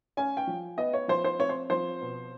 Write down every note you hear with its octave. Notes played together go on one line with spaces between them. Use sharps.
C#4 G#5
G5
F3
B3 D#5
C#5
F3 C5
C5
C4 C#5
C5
F3 C5
B2